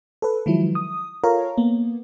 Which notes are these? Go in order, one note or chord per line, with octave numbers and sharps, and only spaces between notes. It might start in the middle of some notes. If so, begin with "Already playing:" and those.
A4 B4
D#3 F3 F#3 G#3 E4
D#6
F4 A4 A#4 C#5 F5 A#5
A#3 B3